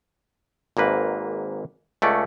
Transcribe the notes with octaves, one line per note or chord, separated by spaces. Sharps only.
G#1 G#2 A#3 B4
C#2 A3 C#4 D5